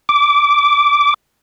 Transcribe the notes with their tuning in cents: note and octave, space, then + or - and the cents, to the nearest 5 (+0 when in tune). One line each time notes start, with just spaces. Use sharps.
D6 -15